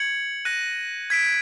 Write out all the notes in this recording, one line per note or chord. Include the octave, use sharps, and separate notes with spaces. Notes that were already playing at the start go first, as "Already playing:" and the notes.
Already playing: G#6 C#7 F#7
F#6 A#6 D#7
G#6 B6 D7